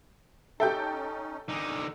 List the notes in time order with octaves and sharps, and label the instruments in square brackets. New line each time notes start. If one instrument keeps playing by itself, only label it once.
[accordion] C#4 D#4 [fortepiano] G4 E5 [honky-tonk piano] A4 G5 G6
[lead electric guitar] D3 D#4 [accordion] G#5 D6 D#6